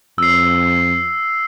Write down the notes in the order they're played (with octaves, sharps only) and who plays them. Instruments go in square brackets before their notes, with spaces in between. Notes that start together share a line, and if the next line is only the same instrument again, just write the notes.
[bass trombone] F2 [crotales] E6 C7